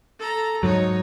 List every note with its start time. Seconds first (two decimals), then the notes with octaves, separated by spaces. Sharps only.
0.19 A4 A#5
0.63 G#2 F#3 D#4 C#5